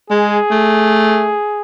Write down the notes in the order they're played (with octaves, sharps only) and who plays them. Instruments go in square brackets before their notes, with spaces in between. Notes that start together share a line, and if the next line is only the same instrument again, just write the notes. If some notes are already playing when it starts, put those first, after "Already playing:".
[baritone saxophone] G#3 [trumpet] G#4
[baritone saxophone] A3